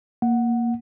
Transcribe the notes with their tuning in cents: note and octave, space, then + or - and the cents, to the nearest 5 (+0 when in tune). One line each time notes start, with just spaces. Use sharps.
A#3 +0 F#5 +0